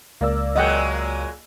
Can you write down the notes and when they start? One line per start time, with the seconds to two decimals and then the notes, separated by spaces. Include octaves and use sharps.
0.21 C#2 A#3 D5 E6
0.56 A#2 F#3 G#3 D#5 F#5 G5